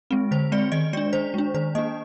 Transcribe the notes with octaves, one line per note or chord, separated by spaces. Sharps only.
G#3 C4
D3 C5
G#3 C4 D5
D#3 D#5
G#3 D4 D5
D#3 C5
G#3 D4
D#3 C5
A#3 D4 D#5